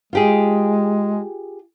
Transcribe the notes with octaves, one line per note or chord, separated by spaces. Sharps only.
G#3 F4 G4 G#4